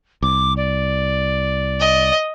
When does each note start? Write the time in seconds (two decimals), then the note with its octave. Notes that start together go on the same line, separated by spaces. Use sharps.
0.23 C2 D6
0.57 D5
1.79 D#5